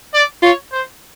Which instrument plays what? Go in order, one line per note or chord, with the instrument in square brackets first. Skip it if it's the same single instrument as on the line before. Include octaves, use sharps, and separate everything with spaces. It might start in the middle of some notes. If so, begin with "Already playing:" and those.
[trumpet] D5
[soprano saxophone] F4 [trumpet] C#5
[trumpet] C5